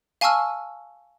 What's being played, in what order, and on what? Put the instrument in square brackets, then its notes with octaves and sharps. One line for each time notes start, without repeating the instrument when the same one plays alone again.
[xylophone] F5 G#5 A5 C#6 E6 F6